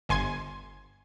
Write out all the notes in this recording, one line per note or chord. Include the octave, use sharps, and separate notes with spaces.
G1 G#5 C6 G#6